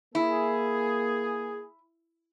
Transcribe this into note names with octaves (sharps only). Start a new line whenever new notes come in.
A#3 E4 G#4